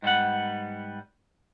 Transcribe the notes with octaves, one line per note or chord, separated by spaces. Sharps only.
G#2 G3 B3 F#5